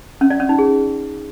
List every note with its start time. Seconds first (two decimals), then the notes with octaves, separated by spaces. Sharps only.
0.21 C#4
0.30 D5
0.40 C#4
0.49 D#4
0.59 G#4